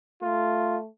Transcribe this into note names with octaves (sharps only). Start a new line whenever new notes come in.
A3 F4